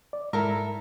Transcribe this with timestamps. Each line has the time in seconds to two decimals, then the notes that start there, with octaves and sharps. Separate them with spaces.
0.13 D5
0.33 G#2 E4 A4 A#4